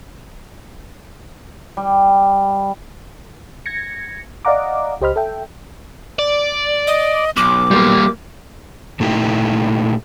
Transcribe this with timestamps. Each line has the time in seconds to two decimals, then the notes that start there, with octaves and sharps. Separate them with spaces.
1.77 G3
3.66 G#6 A#6 C#7
4.45 D5 D#5 F5 F#5 A#5 D6
5.01 C#2 G4 C5 D#5 B5 F6
5.16 A4 E5 G5
6.19 D5
6.87 D#5
7.37 B1 D6
7.71 G3 A#3
9.00 A#2 A3 D#4 E4 G4